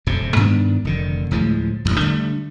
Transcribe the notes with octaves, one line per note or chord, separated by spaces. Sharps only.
D#1 F2 C3
G2 D#3 B3 D4
F1 D3 D#3
D2 A2 F3 G#3
D1 A1 F2
D3 G3 A3